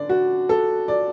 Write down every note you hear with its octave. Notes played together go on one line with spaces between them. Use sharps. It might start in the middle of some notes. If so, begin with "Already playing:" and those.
Already playing: D3 D5
F#4
A4
D5